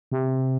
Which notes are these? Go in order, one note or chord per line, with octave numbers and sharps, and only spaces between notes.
C3